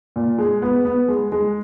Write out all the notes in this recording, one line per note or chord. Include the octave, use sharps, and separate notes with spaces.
A#2
G#3
B3
B3
G#3
G#3